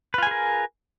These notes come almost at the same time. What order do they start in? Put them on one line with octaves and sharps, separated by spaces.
B4 F4 G#5 G#4 A#4